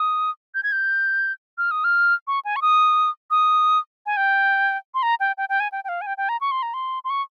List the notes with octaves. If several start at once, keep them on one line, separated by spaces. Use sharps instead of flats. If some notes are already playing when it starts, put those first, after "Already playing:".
Already playing: D#6
G6
G#6
G6
F6
D#6
F6
C#6
G#5
C#6
D#6
D#6
G#5
G5
C6
A#5
G5
G5
G5
G#5
G5
G5
F5
G#5
G5
G5
A#5
C#6
C6
A#5
C6
C6
C#6